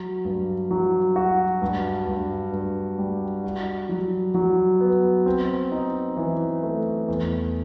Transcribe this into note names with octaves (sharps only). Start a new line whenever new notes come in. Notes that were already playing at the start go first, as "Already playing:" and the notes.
Already playing: F#3
G2
F#3
F#4
G2
G2
G2
G3
F#4
F#3
F#3
B3
C4
D#4
E3
A3
E2